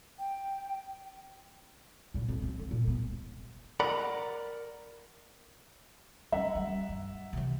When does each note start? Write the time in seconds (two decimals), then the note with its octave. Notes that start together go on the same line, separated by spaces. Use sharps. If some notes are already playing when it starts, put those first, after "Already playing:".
0.19 G5
2.14 A#2 C#3
2.29 F2
2.42 C4 C#4
2.58 D3
2.71 A#2
2.84 D3 B3
3.80 A#4 D5 F#5 A#5 B5
6.32 G3 C#4 E5 F#5 A#5
6.55 G3
6.89 G2
7.33 C3 E3